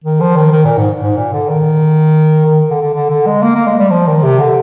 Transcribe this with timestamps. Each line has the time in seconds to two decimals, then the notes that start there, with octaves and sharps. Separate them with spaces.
0.04 D#3
0.20 F3
0.36 D#3
0.52 D#3
0.65 A#2
0.77 G#2
1.01 G#2
1.17 A#2
1.33 D3
1.49 D#3
2.46 D#3
2.70 D3
2.82 D3
2.94 D3
3.10 D3
3.27 G#3
3.43 A#3
3.55 A#3
3.67 G#3
3.79 G3
3.91 F3
4.07 D#3
4.23 C3
4.40 D3